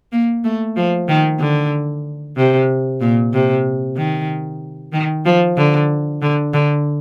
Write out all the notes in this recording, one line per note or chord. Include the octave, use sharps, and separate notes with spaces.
A#3
A3
F3
D#3
D3
C3
A#2
C3
D#3
D#3
F3
D3
D3
D3